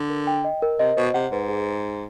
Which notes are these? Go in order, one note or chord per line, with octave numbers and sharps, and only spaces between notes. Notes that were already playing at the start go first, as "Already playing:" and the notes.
Already playing: D3
A#4
G5
D#5
A#4
C3 D#5
B2 C5
C3 F#5
G#2 B4
G#4